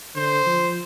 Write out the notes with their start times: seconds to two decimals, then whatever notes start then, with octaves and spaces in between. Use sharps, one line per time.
0.16 D3 C5
0.46 F3